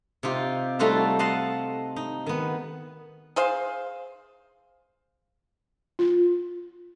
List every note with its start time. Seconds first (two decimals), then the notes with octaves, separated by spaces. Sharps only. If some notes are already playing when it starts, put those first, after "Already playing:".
0.23 C3 D#4 F4 G4
0.79 G3 A3 D#4 F4 F#4 A4
1.19 D#5 F5 F#5 A5 C6
1.96 D#4
2.26 D#3 B3
3.36 G#4 C5 F5
5.99 F4